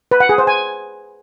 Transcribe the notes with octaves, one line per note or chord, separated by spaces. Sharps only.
B4
F#5
G#4
C5
G#5